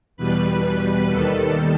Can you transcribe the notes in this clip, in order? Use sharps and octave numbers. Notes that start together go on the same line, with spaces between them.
E2 B2 G3 B4
D#2 D#3 G3 A4